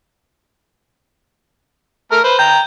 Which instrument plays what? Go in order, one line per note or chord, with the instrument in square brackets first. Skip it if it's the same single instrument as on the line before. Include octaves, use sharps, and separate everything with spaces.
[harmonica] A3 A#4 F6
B4 C5
[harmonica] G5 A#5 [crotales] G6